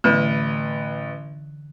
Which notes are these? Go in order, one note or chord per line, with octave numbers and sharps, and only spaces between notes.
A1 D3 E3 B4